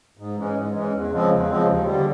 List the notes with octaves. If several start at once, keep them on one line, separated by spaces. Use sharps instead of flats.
G#2
E3 G#3 C#4
G#2
E3 G#3 C#4
E2
C#3 F3 G#3 C4
E2
C#3 F3 G#3 C4
D#2
D3 G3